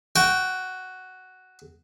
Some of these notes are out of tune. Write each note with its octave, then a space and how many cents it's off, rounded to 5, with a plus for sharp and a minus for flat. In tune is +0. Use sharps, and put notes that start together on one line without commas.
F#4 +5 G5 -10